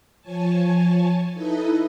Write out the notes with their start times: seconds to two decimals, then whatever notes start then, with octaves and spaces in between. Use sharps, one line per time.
0.21 F3 C#5 G#5 A5
1.34 D#4 E4 A4 B4 D#5